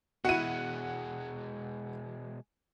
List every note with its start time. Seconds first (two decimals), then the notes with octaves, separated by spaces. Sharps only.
0.25 B2 G#3 E4 F#4 F#5 D#7